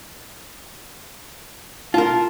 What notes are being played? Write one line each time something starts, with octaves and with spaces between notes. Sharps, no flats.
F4 A#4 A5